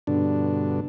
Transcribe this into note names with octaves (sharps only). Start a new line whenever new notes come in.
G2 B2 D3 D4